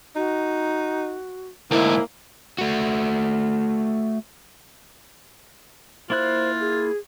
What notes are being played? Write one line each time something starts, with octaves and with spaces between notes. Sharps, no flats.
D#4 F#4
D2 G#2 A#3 E4
A3 F#4
A#3 E4 F4 C5 F#6
G#4